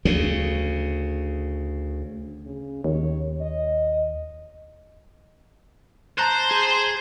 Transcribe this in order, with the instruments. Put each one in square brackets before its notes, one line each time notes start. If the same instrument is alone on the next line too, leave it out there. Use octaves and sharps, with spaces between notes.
[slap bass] D2 C#3
[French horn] C#3
[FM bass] D#2 [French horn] C#5
[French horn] D#5
[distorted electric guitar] C5 [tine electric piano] A5 A#5 F#6
[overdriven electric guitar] G#4